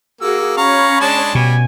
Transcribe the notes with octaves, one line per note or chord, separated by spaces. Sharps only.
A#3 F#4 G#4 E6
C#4 C#5 F5 A#5 B5 C#6
G#3 D4 A5
B2 G3 G#5